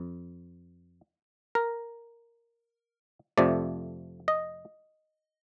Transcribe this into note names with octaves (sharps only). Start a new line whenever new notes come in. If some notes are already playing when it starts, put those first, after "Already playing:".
Already playing: F2
A#4
F2 C3 F3 A3 D5
D#5